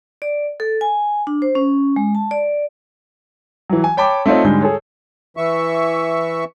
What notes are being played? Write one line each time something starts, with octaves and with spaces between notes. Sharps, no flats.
D5
A4
G#5
D4
C5
C#4
G#3
A5
D5
E3 F#3
G#5
C#5 G5 A5 B5 D6
A3 C4 D#4 F4 C#5 D#5
G#2 D3 G3 G#3 G6
G#4 A4 C#5
E3 E5 C#6